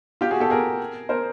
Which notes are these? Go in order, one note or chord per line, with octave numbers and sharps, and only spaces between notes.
F4 G4
F#4 G#4
G4 A4
G#4 A#4
A#4 C5